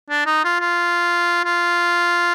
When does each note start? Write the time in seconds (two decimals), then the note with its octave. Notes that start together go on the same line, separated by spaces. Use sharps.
0.09 D4
0.26 D#4
0.44 F4
0.60 F4
1.45 F4